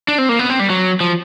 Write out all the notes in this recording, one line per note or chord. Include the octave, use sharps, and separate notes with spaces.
D4
C4
A#3
B3
C4
G3
F#3
F3